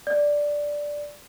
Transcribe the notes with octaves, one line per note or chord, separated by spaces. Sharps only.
D5